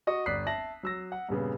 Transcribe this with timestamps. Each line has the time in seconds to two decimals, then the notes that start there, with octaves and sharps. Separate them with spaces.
0.07 F#4 D#5 C#6
0.26 G1 D5 D#6 F#6 B6 C7
0.47 E5 A5 A#6 F#7
0.83 F#3 E6 A#6
1.12 F#5
1.29 G2 A#2 C#3 B3